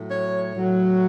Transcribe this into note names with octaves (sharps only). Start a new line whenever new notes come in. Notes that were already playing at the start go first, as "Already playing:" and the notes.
Already playing: A2 F#3
C#5
A2 F#3